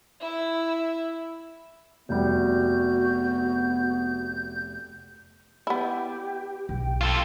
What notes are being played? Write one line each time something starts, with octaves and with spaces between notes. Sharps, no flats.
E4 E5
F1 G3 B3 F#4 G6
B3 E4 G4
B1 G5
F4 A4